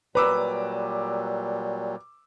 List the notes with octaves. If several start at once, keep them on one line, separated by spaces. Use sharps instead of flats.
A#2 F#3 G3 B4 A#5 D6 E6